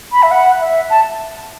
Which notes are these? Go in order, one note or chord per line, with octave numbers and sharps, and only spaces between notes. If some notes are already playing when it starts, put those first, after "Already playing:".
B5
E5
F#5
E5
A5